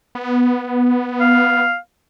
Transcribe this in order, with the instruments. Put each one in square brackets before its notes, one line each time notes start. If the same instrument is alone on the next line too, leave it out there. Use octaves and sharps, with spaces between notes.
[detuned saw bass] B3
[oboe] F5